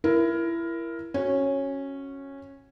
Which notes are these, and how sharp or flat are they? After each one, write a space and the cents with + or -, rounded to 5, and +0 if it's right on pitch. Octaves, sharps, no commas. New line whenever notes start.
E4 +25 A#4 +10
C#4 -10 F#4 +0